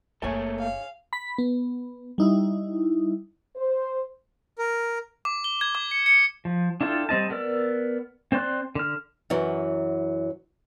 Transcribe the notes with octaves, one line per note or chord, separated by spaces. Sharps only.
F#1 D3 A3 A#3 G#4 A4 C#5 G#5
F5
B5 B6
B3
G3 D#4 E4
C5
A#4
D6
G7
G#6
D6
C#7
C#7
F3
D4 E4 F4 A4 G5
G3 C4 D#5 A5
B3 A#4 D5 E6
C4 C5 D5 C6 F#6
D3 F6
F#2 E3 F#3